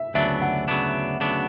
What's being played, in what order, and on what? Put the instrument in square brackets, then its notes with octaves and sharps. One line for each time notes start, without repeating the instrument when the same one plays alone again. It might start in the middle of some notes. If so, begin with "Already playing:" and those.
Already playing: [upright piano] E5
[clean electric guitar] D2 C#3 F#3 B3 D4 [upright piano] E5
[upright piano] F#5
[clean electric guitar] D2 C#3 F#3 B3 D4
D2 C#3 F#3 B3 D4